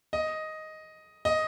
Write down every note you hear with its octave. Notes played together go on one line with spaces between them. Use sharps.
D#5
D#5